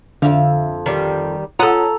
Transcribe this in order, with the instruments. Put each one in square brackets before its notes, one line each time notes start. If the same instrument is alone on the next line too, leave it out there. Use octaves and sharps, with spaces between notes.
[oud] F2 E5 F5 [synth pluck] D3
[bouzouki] D#3 G3
[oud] C#4 [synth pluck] F4 F#5 D#6 [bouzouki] A4 A#5